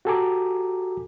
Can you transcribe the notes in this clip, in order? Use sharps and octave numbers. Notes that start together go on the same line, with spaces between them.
F#4 G4 A4 G#5 A#5 D6